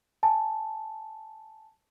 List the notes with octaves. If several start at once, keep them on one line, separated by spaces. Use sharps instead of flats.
G#5 A5